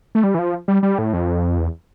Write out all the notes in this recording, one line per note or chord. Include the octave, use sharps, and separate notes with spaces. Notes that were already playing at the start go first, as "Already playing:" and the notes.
A3
G3
E3
F3
G3
G3
A2
F2
E2